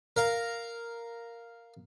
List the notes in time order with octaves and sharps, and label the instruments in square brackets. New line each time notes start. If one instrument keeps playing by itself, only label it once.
[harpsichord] A#4 F5 A#5